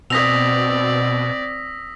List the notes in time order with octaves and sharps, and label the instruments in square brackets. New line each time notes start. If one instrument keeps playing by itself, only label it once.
[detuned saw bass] B2 [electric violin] C4 D5 [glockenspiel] D#6 F7 [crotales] E6 A#6 B6